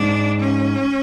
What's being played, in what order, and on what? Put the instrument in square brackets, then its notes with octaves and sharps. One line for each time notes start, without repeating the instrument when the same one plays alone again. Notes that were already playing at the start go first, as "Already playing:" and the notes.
Already playing: [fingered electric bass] G#2 [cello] D4
[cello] C#4